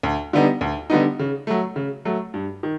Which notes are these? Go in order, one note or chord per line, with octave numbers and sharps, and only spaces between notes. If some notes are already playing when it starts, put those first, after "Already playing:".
D2
D3 G3 B3 D#4
D2
D3 G3 B3 D#4
C#3
F#3 A3
C#3
F#3 A3
G2
D#3